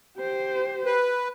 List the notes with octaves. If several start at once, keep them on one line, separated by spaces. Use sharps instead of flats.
G4 C5
B4